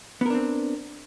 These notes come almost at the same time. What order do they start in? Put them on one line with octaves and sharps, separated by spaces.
B3 A#4 D4 C4